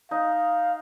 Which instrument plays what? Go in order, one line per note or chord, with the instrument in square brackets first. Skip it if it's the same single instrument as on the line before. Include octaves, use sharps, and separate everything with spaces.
[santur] D#4 [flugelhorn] F5